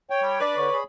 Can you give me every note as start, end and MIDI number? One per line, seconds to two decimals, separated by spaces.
0.10 0.40 73
0.10 0.40 79
0.22 0.38 55
0.40 0.54 62
0.40 0.76 71
0.40 0.76 74
0.56 0.70 50
0.56 0.79 73
0.72 0.84 68
0.72 0.84 83